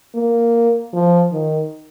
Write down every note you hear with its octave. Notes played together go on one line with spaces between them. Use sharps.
A#3
F3
D#3